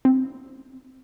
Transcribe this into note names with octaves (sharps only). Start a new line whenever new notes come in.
C4